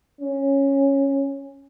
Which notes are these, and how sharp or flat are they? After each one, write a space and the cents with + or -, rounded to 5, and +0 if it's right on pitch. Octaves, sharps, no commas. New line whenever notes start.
C#4 -10